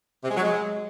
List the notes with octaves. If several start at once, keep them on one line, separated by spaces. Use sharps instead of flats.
C3
G#3
F#3
G#3